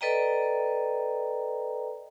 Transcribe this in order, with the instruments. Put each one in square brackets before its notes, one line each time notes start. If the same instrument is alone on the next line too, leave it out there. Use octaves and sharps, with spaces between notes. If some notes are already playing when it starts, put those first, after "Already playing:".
[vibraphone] A4 B4 D5 D#5 G5 A#5